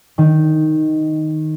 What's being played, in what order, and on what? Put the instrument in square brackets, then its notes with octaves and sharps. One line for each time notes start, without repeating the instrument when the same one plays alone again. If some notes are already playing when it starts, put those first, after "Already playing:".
[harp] D#3